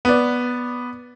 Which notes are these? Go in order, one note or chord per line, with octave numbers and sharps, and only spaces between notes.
B3 D5